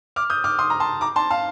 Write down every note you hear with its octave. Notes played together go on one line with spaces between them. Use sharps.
D6 F6
D#6 G6
D6 F6
C6 D#6
A#5
A5 C6
A#5 D6
A5 C6
F5 A5